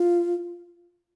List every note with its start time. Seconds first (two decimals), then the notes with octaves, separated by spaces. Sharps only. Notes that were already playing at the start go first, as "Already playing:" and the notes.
Already playing: F4